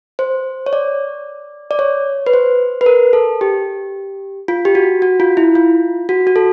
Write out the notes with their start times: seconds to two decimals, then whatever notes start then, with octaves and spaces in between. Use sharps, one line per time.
0.19 C5
0.66 C#5
0.73 D5
1.71 D5
1.79 C#5
2.27 B4
2.33 C5
2.81 B4
2.86 A#4
3.13 A4
3.41 G4
4.48 F4
4.65 G4
4.75 F#4
5.02 F#4
5.20 F4
5.37 E4
5.55 F4
6.09 F#4
6.27 F#4
6.36 A4